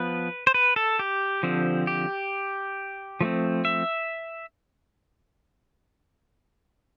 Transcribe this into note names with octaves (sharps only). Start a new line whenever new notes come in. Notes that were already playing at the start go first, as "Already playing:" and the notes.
Already playing: F3 B3 B4
C5
B4
A4
G4
D3 F3 C4
G4
F3 A3 C4
E5